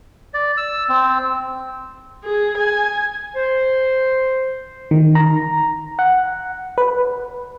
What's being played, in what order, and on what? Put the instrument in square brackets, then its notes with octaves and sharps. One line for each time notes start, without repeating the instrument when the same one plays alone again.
[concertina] D5
E6
C4
[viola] G#4
G#5
[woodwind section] C5
[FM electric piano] D#3
A#5
F#5
B4